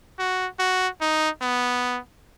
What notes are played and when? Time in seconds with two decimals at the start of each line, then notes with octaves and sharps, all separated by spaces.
0.19 F#4
0.60 F#4
1.01 D#4
1.42 B3